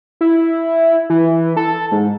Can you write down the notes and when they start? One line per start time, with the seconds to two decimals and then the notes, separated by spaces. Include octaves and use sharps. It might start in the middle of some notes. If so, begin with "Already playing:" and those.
0.21 E4
1.10 E3
1.57 A4
1.92 G#2